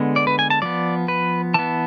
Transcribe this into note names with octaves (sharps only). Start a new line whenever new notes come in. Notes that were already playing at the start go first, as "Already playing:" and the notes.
Already playing: D3 G#3 B3
D5
B4
G#5
A5
F3 B3 D5
B4
E3 B3 A5